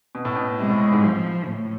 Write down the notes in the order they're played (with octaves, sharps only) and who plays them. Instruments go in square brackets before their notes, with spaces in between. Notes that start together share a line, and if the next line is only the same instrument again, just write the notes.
[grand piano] B2
A2
B2
[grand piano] C3 [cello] G#3
[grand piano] A2
A2
G#2
[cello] F3
A2